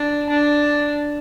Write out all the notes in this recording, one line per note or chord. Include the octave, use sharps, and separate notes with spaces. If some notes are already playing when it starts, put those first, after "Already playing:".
Already playing: D4
D4